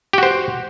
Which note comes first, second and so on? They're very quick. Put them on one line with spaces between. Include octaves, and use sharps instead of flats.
G4 F#4 C5